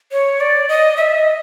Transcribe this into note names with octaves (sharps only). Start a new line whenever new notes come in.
C#5
D5
D#5
E5
D#5